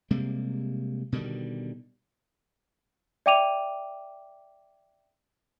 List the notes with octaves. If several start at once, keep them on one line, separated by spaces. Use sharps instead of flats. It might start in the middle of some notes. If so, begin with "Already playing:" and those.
C3 G3 G#3 A#3
B2 D3 D#3 G3
D5 E5 G5 D6 D#7 F7